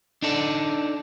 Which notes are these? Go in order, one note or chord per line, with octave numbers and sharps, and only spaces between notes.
D4 D#4 A4 D5